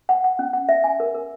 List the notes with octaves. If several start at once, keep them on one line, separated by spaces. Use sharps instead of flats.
F#5
F#5
C#4
F#5
E5
G#5
A#4
A#4